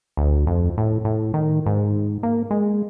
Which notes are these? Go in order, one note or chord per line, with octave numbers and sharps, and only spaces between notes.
D2
F2
A2
A2
D#3
G#2
A#3
G#3